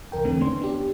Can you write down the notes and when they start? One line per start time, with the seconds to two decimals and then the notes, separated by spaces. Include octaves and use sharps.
0.12 B1 E2 A#4 G5
0.24 E2 D3 E3 A3 C4
0.40 D3 B3 C#4 D4 C6
0.62 D4 G4